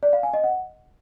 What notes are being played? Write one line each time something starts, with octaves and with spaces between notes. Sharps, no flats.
D5
F5
G#5
D#5
F#5